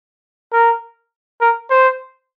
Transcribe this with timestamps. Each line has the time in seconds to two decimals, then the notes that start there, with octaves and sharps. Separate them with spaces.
0.53 A#4
1.41 A#4
1.70 C5